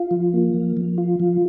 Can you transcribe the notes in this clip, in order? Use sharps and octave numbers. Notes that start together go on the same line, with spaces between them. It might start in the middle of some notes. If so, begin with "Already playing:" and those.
Already playing: F4
F3
A#3
F3
F3
F4
F3